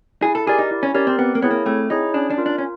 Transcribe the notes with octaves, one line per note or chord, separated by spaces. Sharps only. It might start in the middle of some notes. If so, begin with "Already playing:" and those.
E4 G#4
A4
G4 G#4 A#4 D5
D#4
E4
C#4
C#4 G4 A#4 D5
C4
B3 C4
A#3
B3 E4 G#4 C#5
A#3
A3 C4
D#4 E4 G#4 C#5
C#4 D4
D4
F4 A#4
D4
C#4